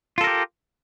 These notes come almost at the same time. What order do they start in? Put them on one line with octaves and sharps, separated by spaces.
F4 A4 A#4 G4